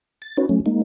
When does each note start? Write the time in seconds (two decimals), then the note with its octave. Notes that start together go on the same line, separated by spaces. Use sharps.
0.22 A6
0.37 C#4 D#4 F#4 B4 C#5
0.49 F#3 A3 C#4
0.66 G#3 A#3 D#4